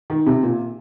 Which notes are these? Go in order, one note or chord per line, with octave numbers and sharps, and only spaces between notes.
D#3
C3
A#2